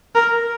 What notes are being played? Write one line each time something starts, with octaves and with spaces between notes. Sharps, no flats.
A#4